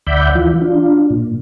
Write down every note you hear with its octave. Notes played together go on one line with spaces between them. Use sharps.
D2 D5 E5 F#5 B5 G6
E3 F4
D4 F4
A#2